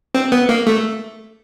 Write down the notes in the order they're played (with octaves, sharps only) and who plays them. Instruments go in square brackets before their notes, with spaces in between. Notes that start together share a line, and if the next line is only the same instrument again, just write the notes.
[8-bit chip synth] C4
B3
A#3
A3